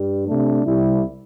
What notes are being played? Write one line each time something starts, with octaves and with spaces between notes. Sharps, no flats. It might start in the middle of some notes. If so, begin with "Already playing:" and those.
Already playing: G2 G3
C3 A3 D4
C2 C3 G3 E4